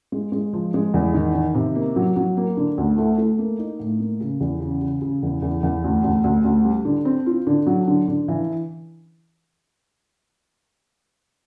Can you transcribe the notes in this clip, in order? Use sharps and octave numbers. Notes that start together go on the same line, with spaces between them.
G#3
G#3
F3
G#3
E2
D#3
D#3
C3
A#3
F#3
F#3
A#3
D3
D2
A3
A3
A#3
D#4
A2
A#3
C#3
E2
C#3
C#3
C#3
E2
E2
E2
D2
D2
D2
D2
G3
D3
C4
F4
D3
F#3
D3
D3
E3